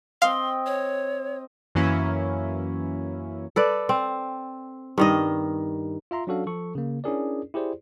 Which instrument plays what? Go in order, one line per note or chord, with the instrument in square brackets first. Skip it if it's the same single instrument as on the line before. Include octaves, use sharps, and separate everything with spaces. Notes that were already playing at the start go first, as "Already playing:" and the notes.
[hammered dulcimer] C4 D#5 G5 [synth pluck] F5 [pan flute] C6
[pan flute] C#5
[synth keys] F#2 E3 A#3 C#4 E4
[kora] A4 B4 D5
C4
G2 D#3 D#5
[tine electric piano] F4 E5 A#5 C6
F#3 C#4 D4 F#4 A4 F5
F3 A4 C#6
C#3 A#3
C#4 D4 E4 G#4 A#4 D5
E4 G4 G#4 C5 D5